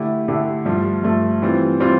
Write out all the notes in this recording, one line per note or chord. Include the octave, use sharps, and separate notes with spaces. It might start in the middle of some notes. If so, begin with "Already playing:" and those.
Already playing: D3 A3 E4 G4
D3 A3 E4 G4
G2 F3 A3
G2 F3 A3
E3 G3 C4 F4
E3 G3 C4 F4